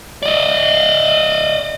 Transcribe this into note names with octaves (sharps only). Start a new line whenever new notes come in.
D5 D#5